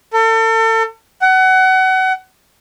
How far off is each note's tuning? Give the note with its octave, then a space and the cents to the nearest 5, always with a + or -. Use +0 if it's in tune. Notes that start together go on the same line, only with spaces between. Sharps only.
A4 +35
F#5 +25